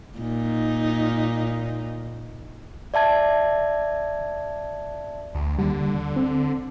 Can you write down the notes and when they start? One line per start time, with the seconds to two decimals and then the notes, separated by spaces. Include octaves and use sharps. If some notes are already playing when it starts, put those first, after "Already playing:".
0.19 A#2 D#4
2.94 D5 E5 A5 G#6
5.35 D2
5.59 D#2 D3 G3
6.16 C4